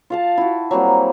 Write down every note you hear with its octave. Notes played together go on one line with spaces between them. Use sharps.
F4 F5 A5
E4 F#4
F#3 G3 A#3 C4